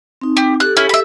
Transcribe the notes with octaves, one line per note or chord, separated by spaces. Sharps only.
C4 D#4
G4
G4 A4 F#6
C#4 E4
E5 B5